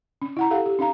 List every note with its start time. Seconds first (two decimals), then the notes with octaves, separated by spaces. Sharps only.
0.22 C#4
0.37 E4 F#5 A#5
0.50 G4 A4 F5 F#5
0.66 G4
0.79 C#4 D#4 F5 A#5